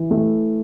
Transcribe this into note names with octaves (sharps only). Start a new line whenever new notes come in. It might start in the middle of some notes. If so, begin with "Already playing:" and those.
Already playing: E3
A3